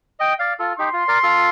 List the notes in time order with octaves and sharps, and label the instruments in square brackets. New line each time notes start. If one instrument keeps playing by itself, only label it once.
[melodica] D#5 G5
D5 F5
F4 A4
[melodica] D#4 G4 [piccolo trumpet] C6
[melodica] F4
A#4 D5
F4 A4